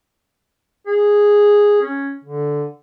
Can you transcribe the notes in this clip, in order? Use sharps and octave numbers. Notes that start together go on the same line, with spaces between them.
G#4
C#4
D3